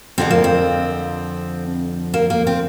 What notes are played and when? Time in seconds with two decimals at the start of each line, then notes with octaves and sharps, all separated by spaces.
0.18 F2 D3 F3 G#3 C4
0.31 A#3
0.44 C4
2.14 A#3
2.30 A#3
2.47 C4